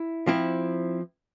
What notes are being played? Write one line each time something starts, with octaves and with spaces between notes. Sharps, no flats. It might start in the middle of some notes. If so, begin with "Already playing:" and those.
Already playing: E4
F3 C4 E4